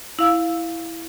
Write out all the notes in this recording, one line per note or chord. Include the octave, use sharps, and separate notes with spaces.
E4 F5 E6